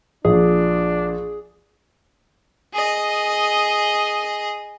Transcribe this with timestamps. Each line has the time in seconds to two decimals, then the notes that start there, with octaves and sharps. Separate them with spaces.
0.25 A#1 D4 G#4
2.73 G#4 D#5